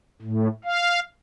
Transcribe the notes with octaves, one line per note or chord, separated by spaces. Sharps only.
A2
F5